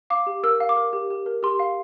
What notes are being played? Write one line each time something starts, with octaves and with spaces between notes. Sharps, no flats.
F5 D6
G4
A#4 E6
F5
D6
A#4
G4
G4
A#4
G4 C6
F5